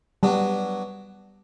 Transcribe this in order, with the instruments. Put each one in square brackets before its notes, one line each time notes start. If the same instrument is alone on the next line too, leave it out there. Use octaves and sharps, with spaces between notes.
[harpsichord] F#3 B3 D4 [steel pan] G3